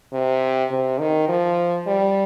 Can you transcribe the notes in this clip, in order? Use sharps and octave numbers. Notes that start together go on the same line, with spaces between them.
C3
C3
D#3
F3
G3